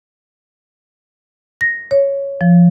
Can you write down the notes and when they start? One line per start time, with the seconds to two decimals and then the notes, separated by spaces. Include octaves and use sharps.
1.61 A#6
1.91 C#5
2.41 F3